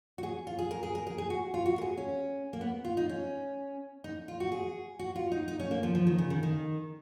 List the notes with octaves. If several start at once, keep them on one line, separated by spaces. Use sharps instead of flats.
F#4
G#4
F4
G#4
A#4
G#4
A#4
G#4
G#4
F#4
F4
F#4
A#4
G#4
C#4
A#3
B3
F4
D#4
C#4
D#4
F4
F#4
G#4
F#4
F4
D#4
D#4
C#4
A#3
F3
F3
D#3
C#3
D#3
D#3